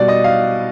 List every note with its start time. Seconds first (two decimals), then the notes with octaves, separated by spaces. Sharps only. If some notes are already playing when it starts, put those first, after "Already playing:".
Already playing: B2 G3 D5
0.08 D#5
0.24 F5